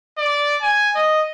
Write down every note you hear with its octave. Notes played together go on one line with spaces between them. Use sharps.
D5
G#5
D#5